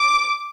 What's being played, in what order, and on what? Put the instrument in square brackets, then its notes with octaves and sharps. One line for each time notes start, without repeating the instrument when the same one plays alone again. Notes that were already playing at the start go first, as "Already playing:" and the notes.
Already playing: [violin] D6